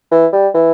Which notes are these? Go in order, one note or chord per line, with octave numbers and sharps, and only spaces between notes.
E3
G3
E3